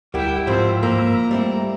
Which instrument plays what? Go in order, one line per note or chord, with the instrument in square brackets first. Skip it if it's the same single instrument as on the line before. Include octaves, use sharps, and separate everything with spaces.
[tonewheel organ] D2 A#4 F#5 [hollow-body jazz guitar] G3 G4 [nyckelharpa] E4 G5
[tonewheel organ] G#2 B5 E6 [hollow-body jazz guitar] F3 C4 [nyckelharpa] C5
[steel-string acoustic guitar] A#3 [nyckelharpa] A#5
[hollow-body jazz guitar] G3 C4 E4 [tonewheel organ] A3